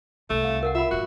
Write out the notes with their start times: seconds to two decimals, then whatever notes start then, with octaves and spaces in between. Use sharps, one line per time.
0.30 C2 A3
0.44 F5
0.63 A#4 F5 F#5
0.75 F4 E5 F#5 B5
0.91 F2 G#2 F#4